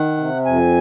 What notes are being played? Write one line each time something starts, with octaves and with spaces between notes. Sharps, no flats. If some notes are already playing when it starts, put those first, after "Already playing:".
Already playing: D#3 F#5
C3
F2 G#5